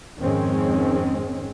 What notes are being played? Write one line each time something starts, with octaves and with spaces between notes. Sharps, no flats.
F2 G#2 D#3 G#3 C4 C#4